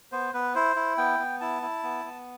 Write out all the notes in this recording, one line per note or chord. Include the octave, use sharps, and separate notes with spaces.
B3 C5
B3 B4
E4 C5
E4
B3 G5
B3
E4 A5
E4
B3
B3